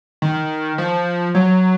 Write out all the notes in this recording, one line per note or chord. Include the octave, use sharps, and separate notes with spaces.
D#3
F3
F#3